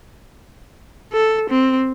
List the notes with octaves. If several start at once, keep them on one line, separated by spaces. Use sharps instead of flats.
A4
C4